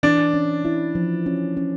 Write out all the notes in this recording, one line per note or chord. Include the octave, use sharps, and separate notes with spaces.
E3 D4
C#4
E4
F3
C#4
C#4